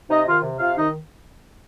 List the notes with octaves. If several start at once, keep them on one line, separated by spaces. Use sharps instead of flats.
C3 D#4 D#5
D#3 F4 F5
C3
C3 F4 F5
D#3 D#4 D#5